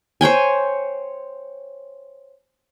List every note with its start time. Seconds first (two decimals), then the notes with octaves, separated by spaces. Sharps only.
0.21 C5 C#5 G5 G#5